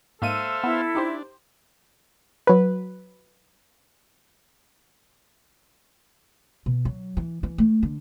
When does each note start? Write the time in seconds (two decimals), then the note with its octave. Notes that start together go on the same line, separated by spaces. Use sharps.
0.22 G#2 A#3 A4 C5 E5 F5 D#7
0.64 B3 E4
0.95 D4 D#4 G4 C5
2.47 F#3 B4
6.66 B2
6.85 F#3
7.17 E3
7.43 E3
7.58 A3
7.83 D3